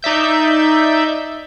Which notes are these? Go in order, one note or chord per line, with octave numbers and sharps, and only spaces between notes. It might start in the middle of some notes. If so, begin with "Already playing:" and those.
D#4 D5 E5 G6